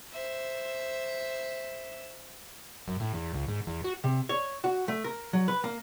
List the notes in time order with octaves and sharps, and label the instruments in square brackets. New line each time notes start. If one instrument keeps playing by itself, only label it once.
[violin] C5 E5
[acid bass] F#2
A2
E2
C#2
G#2
E2
F#4
[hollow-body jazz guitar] C3
C#5
F#4
A3
A#4
F#3
B4
A#3